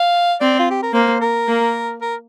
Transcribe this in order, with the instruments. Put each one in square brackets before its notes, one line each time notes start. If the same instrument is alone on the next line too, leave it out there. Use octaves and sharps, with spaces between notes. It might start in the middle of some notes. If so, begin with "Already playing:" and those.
Already playing: [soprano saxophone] F5
[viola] C4 [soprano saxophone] D5
[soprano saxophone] F4
G4
A#4
[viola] A#3 [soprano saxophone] C5
[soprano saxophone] A#4
[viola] A#3
[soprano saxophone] A#4